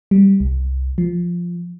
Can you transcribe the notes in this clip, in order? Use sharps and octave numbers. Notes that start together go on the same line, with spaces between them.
G3
C2
F3